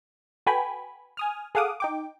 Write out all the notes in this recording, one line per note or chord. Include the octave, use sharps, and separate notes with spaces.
F#4 A4 B4 G5 G#5 B5
G#5 D#6 F6
G#4 A4 F5 F#5 D6 D#6
D#4 G5 D6